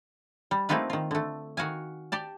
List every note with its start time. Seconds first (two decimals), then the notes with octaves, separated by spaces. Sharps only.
0.51 G3
0.69 A3 A#3 C4 D#4 F4 B4
0.90 D#3 F4
1.11 D3 A3
1.57 D#3 F#4 F5 G#5
2.12 G4 D5 A5